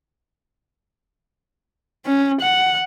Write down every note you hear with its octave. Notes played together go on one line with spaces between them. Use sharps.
C#4
F#5